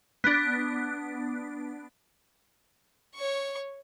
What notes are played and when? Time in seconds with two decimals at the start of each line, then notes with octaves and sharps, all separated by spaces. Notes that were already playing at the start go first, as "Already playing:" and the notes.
0.24 B3 D4
3.15 C#5 C#6